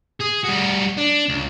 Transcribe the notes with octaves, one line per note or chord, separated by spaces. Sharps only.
G#4
G3 F#4
D4
C#2